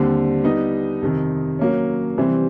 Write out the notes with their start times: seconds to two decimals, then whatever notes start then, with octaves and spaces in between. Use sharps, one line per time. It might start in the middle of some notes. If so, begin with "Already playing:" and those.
Already playing: D#2 D3 G3 C4
0.44 G3 B3 D#4
1.02 F2 C3 D#3
1.59 F#3 A#3 C#4
2.17 C3 E3 G3 C4